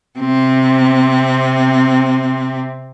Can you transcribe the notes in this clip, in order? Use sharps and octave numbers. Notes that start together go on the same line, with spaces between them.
C3 C4